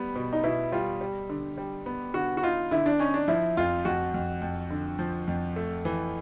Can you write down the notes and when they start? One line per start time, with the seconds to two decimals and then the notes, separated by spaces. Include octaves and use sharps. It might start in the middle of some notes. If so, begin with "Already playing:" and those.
Already playing: G3 B3
0.16 B2
0.33 D#4
0.43 B2 E4
0.72 G3 F4
1.01 G3
1.30 D3
1.58 G3
1.86 B3
2.14 D3 F#4
2.37 F#4
2.43 D#4 F4
2.71 D3 E4
2.86 D4
2.99 C#4 D#4
3.14 D4
3.28 F3 E4
3.57 F2 F4
3.85 F2 F#4
4.14 F2
4.42 F2
4.70 D3
4.99 F3
5.28 F2
5.56 A3
5.85 E3